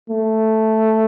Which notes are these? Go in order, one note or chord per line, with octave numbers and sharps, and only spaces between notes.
A3